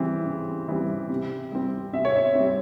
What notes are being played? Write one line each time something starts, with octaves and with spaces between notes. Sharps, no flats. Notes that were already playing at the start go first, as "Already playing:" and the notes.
Already playing: C#3 E3 G3 C4
C#3
E3 G3 C4
C3
G3 C4
C3 E5
C#5
E5
G3 C4